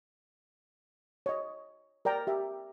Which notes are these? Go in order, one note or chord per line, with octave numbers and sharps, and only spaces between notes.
C#5 D#5
A#4 D5 G5 A#5
G4 E5